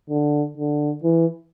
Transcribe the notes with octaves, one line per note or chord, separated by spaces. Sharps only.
D3
D3
E3